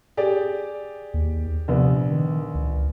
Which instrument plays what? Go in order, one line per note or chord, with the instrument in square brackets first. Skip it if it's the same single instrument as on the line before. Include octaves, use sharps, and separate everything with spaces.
[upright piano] G4 G#4 D5
[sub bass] D#2
[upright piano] A#1 B3 [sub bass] C3
[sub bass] D#3
C#2